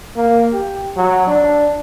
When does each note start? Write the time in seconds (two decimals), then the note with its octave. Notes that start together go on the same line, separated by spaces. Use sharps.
0.16 A#3
0.53 G4
0.96 F#3
1.27 D4